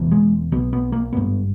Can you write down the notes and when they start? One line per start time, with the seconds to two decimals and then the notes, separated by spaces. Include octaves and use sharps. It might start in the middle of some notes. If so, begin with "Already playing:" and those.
Already playing: E1 E2 B2
0.11 G#3
0.52 B1 B2 B3
0.73 B3
0.92 A#3
1.13 G#1 G2 B3